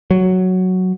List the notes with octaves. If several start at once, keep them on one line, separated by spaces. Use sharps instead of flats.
F#3